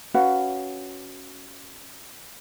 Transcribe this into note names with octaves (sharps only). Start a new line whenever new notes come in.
C#4 F#4 B4 F5